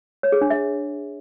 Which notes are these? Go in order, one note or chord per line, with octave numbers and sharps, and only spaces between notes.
C#5
G#4
D4
E5